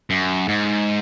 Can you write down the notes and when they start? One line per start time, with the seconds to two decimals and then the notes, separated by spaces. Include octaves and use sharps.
0.10 F#2
0.48 G#2